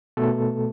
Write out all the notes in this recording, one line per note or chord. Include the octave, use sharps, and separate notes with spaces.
B2 A3 A4